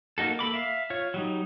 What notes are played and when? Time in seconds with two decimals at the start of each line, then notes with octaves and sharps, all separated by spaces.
0.18 A#3 D#4 F#4 A4
0.39 A#3 A4 B5 D6
0.54 E5 F5
0.90 F4 C#5
1.14 F#3 G3 D#4